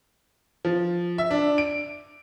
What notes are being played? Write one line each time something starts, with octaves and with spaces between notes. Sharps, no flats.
F3
E5
D4
D7